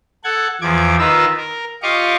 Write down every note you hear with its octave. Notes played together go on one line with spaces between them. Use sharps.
A4 F#5 G#6
E2 F3 D6 G#6
D#3 F4 B4 A#5 E6
A#4
F4 G4 D#5 F5 C#6 D6